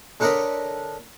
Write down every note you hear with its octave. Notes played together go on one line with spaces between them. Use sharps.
D3 D4 A#4 C#5 D#5 B5